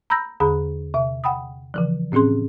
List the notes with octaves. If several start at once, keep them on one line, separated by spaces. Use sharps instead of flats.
A#5 B5 E6 G6 A#6
E2 D3 G#4 A#5 B5
C3 E5
F#5 G5 B5 D#6
C#3 E3 F3
A2 C4 C#4 G#4 C6